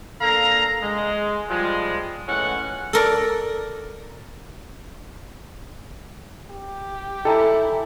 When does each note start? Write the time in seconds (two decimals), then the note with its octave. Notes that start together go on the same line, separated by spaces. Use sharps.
0.21 A#3 D4 A4 F5 A#5
0.83 G#3
1.50 F3 G3 G#3
2.28 A2 E3 G#3 C#4 F#5
2.93 A4 A#4 D5
6.51 G4
7.25 E4 A4 G5 G#5 A#5